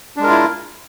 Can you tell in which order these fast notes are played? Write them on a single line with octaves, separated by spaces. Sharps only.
D4 G#3 A#4 F4 E4